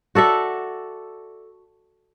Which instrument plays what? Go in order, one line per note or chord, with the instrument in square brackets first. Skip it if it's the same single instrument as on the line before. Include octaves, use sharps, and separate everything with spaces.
[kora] F#4 A4 D5 E5